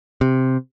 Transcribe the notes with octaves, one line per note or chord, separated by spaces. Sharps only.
C3